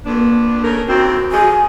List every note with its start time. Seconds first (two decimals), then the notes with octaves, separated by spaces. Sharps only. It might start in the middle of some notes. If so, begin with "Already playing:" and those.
0.05 F2 A#3 B3 D4
0.63 C#3 A3 A#4
0.88 D#2 C4 F#4
1.32 F2 F3 G#3 G#5